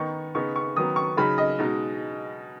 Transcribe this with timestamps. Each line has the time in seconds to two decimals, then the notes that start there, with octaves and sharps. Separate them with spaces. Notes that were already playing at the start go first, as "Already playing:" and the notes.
Already playing: D#3 B3 D#4 C#6
0.35 C#3 B3 D#4 C#6
0.56 C#6
0.76 D#3 F#3 B3 D#6
0.96 C#6
1.17 C#3 F#3 D#4 B5
1.38 D#5
1.59 B2 G#3 D#4